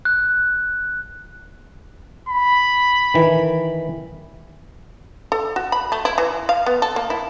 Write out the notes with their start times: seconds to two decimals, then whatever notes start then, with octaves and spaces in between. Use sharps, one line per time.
0.05 F#6
2.29 B5
3.14 D#3 E3
5.32 A4
5.56 F#4
5.72 B5
5.92 A3
6.05 E4
6.18 E3
6.49 F5
6.66 B3
6.82 A4
6.96 A#3
7.10 E4